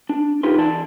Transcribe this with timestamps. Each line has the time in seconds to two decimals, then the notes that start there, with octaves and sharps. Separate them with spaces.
0.09 D4
0.43 D#2 D#4 F4 G4 B4 C6
0.58 E3 D5 A5